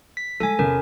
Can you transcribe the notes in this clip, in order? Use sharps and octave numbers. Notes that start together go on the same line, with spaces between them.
B6
G3 G#3 A4 G#5
E2 C3 C#4 A#4